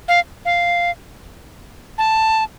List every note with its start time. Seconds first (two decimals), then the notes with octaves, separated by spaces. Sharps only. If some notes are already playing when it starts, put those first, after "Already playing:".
0.08 F5
0.45 F5
1.98 A5